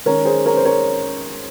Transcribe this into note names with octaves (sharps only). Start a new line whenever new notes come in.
D#3 G#3 C#4 A#4 C#5
G#4 C5
A#4 C#5
C5
A#4 C#5